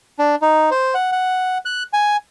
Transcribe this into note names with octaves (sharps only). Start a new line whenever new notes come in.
D4
D#4
C5
F#5
F#5
F#6
G#5